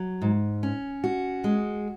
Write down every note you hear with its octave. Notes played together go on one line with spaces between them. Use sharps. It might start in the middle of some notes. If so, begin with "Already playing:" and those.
Already playing: F#3
G#2
C#4
F#4
G#3